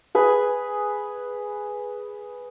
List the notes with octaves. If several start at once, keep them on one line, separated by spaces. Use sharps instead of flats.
G#4 B4 G#5